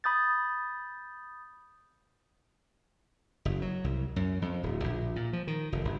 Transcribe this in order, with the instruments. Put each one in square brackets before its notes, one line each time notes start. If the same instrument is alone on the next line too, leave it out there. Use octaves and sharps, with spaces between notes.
[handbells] B5 D#6 G6 A6
[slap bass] F#1
F#3
C2
F#2
F2
D1
A#1
A#2
F3
D#3
F1
G1